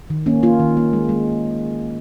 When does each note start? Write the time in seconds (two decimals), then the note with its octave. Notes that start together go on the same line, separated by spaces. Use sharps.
0.10 D#3
0.26 A#3 C#4
0.43 A#3 F4
0.59 D#3
0.77 A#3
0.93 G#3
1.09 G#3